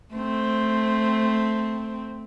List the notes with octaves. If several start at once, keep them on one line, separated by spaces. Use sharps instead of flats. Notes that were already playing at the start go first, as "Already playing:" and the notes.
A3 C4